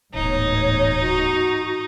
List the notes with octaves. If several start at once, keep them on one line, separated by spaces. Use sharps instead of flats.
D1 A1 G#2 B2 D#4 C#5
F#4